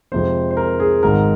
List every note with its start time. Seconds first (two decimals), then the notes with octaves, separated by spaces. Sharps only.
0.12 F2 C3 F3 G#3 C5
0.51 C5
0.57 A#4
0.80 G#4
1.02 G#1 G#2 D#3 A#4